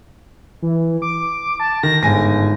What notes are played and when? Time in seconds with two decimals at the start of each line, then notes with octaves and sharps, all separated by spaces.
0.62 E3
1.02 D6
1.60 A5
1.83 D#3 A#6
2.03 G1 G#2 G#5 A#6